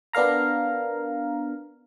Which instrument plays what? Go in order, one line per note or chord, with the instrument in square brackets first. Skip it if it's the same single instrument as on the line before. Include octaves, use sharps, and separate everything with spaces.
[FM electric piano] B3 D4 A#4 F5 A#5